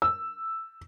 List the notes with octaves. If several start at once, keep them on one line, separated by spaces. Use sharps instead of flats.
E6